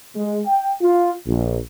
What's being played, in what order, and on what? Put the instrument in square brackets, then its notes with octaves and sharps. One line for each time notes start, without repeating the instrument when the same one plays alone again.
[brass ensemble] G#3
G5
F4
A#1